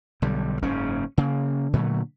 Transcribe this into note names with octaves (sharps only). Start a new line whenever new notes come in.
B1 D3 G3
F#1 G#2 C#3 C#4
C#3 A#3
A#2 D3 F#3 A3